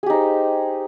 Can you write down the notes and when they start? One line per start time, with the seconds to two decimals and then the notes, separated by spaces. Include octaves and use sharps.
0.03 G#4
0.06 G4
0.10 D#4
0.13 C5